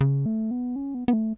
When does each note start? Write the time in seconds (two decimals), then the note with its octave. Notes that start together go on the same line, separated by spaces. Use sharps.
0.01 C#3
0.26 A3
0.51 B3
0.76 C#4
0.95 B3
1.08 B3
1.13 A3